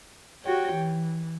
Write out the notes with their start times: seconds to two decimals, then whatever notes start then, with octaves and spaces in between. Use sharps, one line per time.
0.43 F#4 G4 C#5 G5
0.73 E3